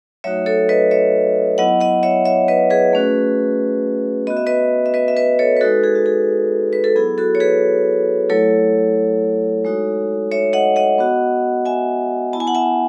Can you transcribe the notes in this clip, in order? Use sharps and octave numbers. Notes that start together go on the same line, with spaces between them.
F#3 A3 D#4 F#4 C#5 E5
A4 C#5
B4 D#5
C#5 E5
F#3 B3 E4 D#5 F#5
D#5 F#5
C#5 E5
C#5 E5
B4 D#5
G#4 B4
A3 C#4 F#4
B3 F#4 D#5
E5
B4 D#5
E5
B4 D#5
E5
B4 D#5
A4 C#5
B4
G#3 D#4 F#4 A4
G#4
F#4
G#4
B4
A4
F#3 B3 E4 G#4
F#4 A4
C#5
G#4 B4
F#3 A3 E4 A4 C#5
G#3 D#4 F#4
C#5 E5
D#5 F#5
D#5 F#5
B3 F#4
E5 G#5
B3 E4 A5
G#5
F#5 A5
E5 G#5